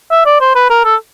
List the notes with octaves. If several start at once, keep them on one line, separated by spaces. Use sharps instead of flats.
E5
D5
C5
B4
A#4
A4